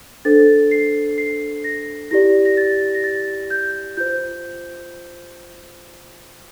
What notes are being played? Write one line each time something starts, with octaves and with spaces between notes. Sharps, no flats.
D4 A4 C5 A6
C7
C7
A#6
E4 G4 D5 A#6
A#6
A6
A#6
A6
G6
F4 C5 G6